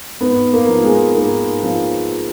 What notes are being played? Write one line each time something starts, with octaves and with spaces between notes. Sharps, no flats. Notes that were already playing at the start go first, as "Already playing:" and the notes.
G#2 B3
A#3
F3
G#3
G#2 A#3
F3